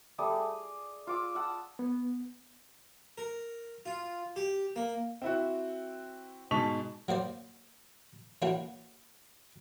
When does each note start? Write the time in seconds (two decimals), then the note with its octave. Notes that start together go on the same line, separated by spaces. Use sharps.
0.18 G3 A3 D5 D#6
0.31 G#4
1.07 F4 D6 E6
1.35 F#5 A5 D#6 E6
1.79 B3
3.18 A#4
3.86 F4
4.36 G4
4.76 A#3
5.22 C4 E4 F#4
6.51 G#2 B2 A5 C#6 B6 F7
7.08 F#3 A#3 C5 D5
8.42 E3 A#3 C#4 D4 F#4